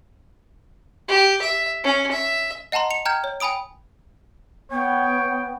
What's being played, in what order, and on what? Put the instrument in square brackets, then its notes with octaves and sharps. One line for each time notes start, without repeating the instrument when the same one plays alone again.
[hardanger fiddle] G4
E5
C#4
E5
[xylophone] D#5 F#5 A5 A#5 C6
C#7 F7
G5 A#5 F6 G6 G#6
C#5
G5 G#5 B5 D#6 D7
[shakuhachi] B3 [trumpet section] C#5 G5